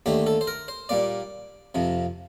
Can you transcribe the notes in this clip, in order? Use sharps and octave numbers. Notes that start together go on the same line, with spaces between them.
D#2 D3 A3 G4
A4
C5
A#4
C5
A#2 G3 A#3 D5
F2 C3 F3